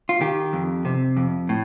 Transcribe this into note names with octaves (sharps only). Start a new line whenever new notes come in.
F4
D#3 G4
F2
C3
F2
A2